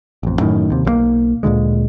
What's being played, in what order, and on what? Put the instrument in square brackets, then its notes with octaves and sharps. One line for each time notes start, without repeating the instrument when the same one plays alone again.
[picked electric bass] A1 F2
F#2 A2 D3 D#3
D#2 C3
B1 F3 A#3
D2 A#2 D3 G#3